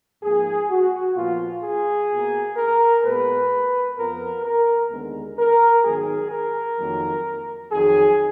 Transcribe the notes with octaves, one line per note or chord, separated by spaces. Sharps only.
G#2 F3 A#3 G#4
F#4
A#2 F3 B3 F4
G#4
B2 A#3
A#4
A#2 G#3 B3 B4
F2 F3 B3 A#4
A#4
D#2 D3 G#3 B3
A#4
G#2 D#3 F#3 B3 G#4
A#4
F2 D#3 F#3 A#3
F2 D#3 F#3 G#4